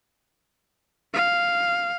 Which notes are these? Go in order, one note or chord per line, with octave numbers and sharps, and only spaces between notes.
F5